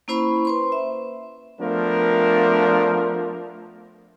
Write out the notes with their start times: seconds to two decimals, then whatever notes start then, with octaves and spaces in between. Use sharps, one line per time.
0.08 A#3 C#4 E4 C5 B5 C#6
0.45 B4 C5 C6
0.72 E5
1.60 F3 A3 B3 D4 A#4